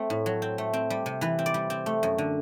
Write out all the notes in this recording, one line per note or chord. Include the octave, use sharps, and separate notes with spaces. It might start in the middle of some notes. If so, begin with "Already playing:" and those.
Already playing: A3 C4
A2
F#3
C4
A3
C4
G3
C3
E3 B4
C4
D5
G3
C4
A3
F#2
D3